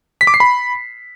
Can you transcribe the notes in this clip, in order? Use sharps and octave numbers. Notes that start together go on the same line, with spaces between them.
B6
D6
C7
B5